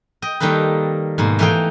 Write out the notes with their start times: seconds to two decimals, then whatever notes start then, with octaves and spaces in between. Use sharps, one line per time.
0.22 D#5 G5
0.40 D#3 G3 A#3 A4 B4
1.18 G#2 B2 A#3
1.39 E3 A3 D#4 F5 G5